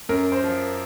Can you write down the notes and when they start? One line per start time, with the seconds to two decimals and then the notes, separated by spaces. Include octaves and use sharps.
0.09 F#2 A#4
0.32 C5
0.44 F3